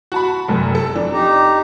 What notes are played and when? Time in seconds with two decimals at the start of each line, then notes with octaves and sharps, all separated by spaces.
0.12 F#4 A5 B5
0.48 F1 F#2
0.75 A4
0.95 F2 D4
1.12 D#4 G4 A#5